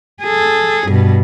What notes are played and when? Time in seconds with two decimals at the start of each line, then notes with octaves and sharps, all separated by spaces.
0.22 G#4 A4
0.88 G2 B2